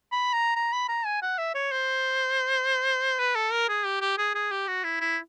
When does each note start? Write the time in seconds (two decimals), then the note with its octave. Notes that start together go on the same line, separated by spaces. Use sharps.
0.12 B5
0.33 A#5
0.56 A#5
0.73 B5
0.89 A#5
1.05 G#5
1.22 F#5
1.38 E5
1.55 C#5
1.72 C5
3.19 B4
3.35 A4
3.52 A#4
3.69 G#4
3.85 G4
4.01 G4
4.18 G#4
4.35 G#4
4.51 G4
4.68 F#4
4.84 E4
5.00 E4